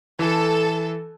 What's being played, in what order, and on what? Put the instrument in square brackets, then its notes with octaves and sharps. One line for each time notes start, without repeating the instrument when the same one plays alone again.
[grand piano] E3 [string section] A4